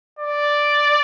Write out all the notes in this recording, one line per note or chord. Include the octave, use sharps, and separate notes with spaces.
D5